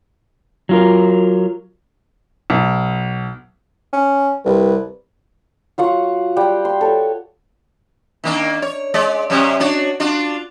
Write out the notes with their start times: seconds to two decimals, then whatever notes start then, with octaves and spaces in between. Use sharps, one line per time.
0.69 F#3 F4 A#4
2.50 B1
3.93 C#4
4.46 C2 G3 B4
5.78 F#3 F4 F#5 C#6
6.37 G3 F#5 G5
6.65 C6
6.81 A4 C#5
8.24 D#3 A#3 D4
8.62 C#5
8.94 G#3 D5
9.30 F#2 C3 C#4
9.60 D4 F#4 C#5
10.00 D4 F4 F#4